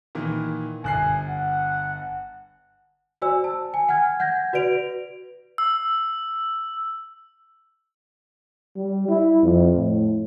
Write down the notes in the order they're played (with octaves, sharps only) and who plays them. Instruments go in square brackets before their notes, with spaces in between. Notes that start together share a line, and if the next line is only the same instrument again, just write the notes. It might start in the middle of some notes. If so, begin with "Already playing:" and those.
[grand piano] A#2 D#3 E3
[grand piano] G1 F#6 C7 [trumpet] G#5
[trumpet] F#5
[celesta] F#4 C5 D5 G#5 E6
A5
G#5
F#5 G#5 F6 G#6
F#5 G6 G#6 A#6
F#4 B4 D5 D7 F7
[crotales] E6
[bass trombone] G3
E4
F2
A2